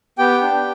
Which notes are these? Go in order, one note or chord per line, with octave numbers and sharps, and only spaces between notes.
B3 G4 G5
D4